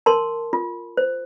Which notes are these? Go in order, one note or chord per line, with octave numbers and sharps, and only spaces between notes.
A#4 A5 C6
F4
C5